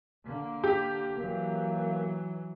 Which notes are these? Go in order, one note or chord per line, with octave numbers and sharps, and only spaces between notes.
D3 A#3
G4
E3 F#3 A#3